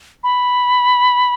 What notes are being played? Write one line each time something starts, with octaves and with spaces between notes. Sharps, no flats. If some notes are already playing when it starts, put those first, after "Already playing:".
B5